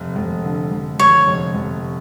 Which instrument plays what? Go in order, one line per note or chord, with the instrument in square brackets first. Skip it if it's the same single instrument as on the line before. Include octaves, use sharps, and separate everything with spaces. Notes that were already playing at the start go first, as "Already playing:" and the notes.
Already playing: [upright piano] F1
F1
D3
F1
[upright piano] F1 [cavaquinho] C#5
[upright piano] F1
F1